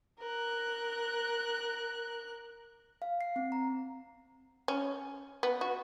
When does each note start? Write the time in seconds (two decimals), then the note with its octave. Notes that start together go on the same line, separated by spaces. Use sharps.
0.20 A#4 F#6
3.02 F5
3.21 C7
3.36 C4
3.52 A#5
4.68 C#4
5.43 B3
5.61 F#4